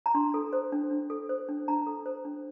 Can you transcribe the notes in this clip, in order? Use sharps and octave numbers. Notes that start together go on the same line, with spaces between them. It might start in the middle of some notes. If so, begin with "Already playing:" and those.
A#5
D4 C6
A4
C5
D4
D4
A4
C5
D4
D4 A#5
A4
C5
D4